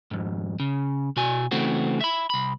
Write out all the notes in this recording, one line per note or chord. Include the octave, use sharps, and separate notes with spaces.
F2 G#2
C#3
B2 F#4 G#5
C#3 E3 A3 C4 F#4
E5 B5
C2 B5